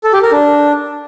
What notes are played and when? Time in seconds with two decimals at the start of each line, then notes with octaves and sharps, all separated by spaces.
0.04 A4
0.13 G4
0.23 A#4
0.32 D4